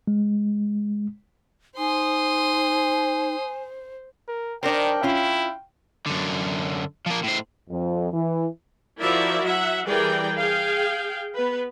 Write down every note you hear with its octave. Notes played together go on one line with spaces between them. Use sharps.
G#3
D#4 C5 G#5 C6 D#6
A#4
D#3 D4 A#4 C5 G5
C#4 E4 F4
F#2 D3
F3 A#3
A2 C5
F2
E3
F3 E4 F#4 A#4 D5 E5
F#3 E5 F#5
E3 G3 G#4 A#4 D5 G5
G#4 F5 G5
B3 B4